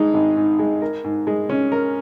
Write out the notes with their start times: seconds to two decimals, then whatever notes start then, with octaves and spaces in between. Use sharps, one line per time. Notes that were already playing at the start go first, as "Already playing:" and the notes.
Already playing: G#1 G#2 G#3 D#4
0.14 G#1
0.37 G#2
0.59 G#3
0.82 A#4
1.04 G#2
1.27 G#3
1.49 C#4
1.72 A#4